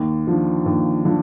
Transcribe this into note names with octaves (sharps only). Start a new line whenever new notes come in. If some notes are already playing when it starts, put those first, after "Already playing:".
Already playing: D#2
D3 F3
D#2
D3 F3